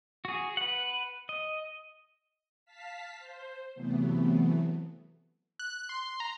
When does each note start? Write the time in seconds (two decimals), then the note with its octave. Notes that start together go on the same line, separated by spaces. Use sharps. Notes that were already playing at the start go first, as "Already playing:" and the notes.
0.25 F#4 G#4
0.57 B4 F#5
1.29 D#5
2.65 F5 A5 B6
3.19 C5
3.75 C3 E3 F#3 A3 B3
5.59 F#6
5.89 C6
6.20 A#5